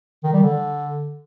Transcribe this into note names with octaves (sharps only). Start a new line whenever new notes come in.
D#3
G3
D3